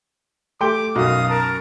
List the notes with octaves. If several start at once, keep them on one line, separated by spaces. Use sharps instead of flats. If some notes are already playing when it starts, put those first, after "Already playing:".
A3 G4 G5 C6 D6
B1 F#2 F#4 F5 D#6
A#4 A5